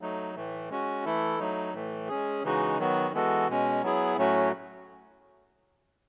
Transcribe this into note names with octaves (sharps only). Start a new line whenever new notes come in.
F#3 A3 D#4
A2 E3 A3
G#3 C#4 F#4
E3 A3 E4 A4
F#3 A3 D#4
A2 E3 A3
G#3 C#4 G#4
C#3 E3 G#3 D#4 F#4
D#3 F#3 B3 F#4
E3 G#3 B3 F#4 A4
B2 G#3 C#4
F#3 B3 E4 G#4
A2 F#3 A3 C#4 F#4